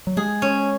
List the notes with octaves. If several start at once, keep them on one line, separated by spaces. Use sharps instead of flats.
F#3
G#3 G#4
C#4